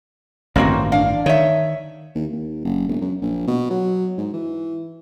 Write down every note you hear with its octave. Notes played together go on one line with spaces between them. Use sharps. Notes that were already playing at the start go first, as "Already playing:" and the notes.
A1 G2 D#3 A#3 C4 F#4
D4 F5
D#3 C#5 E5
D#2
D#2
F#1
E1
F#2
A#1
B2
F#3
G#2
E3